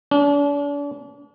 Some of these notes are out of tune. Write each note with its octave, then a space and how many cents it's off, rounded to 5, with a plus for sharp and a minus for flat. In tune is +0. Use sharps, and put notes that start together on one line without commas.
D4 -40